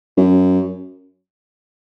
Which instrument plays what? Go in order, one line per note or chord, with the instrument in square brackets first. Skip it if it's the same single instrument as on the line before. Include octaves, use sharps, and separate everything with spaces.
[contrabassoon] F#2